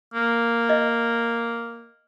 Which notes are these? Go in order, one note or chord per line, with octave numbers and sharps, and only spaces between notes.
A#3
D#5